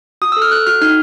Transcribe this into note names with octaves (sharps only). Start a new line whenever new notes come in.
F#4 D#6
A4 E6
F6
A4 F#6
F#4 F6
D#4 F6